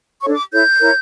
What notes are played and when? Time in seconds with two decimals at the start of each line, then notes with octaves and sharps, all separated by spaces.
0.23 D4 A4 C#5 C#6
0.32 D6
0.52 E4 A4 C#5 G6
0.81 E4 A#4 C#5